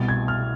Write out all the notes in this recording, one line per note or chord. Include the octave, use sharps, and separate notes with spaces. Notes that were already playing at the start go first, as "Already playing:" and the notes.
Already playing: C2 B2 A6
G#6
F6